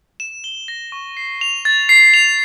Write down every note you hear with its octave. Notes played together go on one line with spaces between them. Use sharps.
E7
G7
A#6
C#6
C7
F7
A6
C7
F7